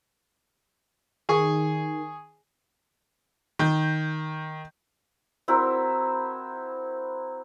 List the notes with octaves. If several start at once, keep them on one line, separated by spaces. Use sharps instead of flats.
D#3 G#4 G#5 C#6
D#3 G6
C4 E4 F#4 A#4